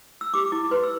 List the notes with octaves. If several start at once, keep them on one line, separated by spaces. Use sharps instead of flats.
E6
G4 D6
E4 D6
B4 C6
E6